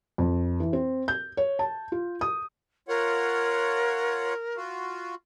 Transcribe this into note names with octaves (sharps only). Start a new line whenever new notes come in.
F2
E3
C4
G6
C#5
A5
F4
D#6
F4 A#4 C#5 F#5
F4 F#4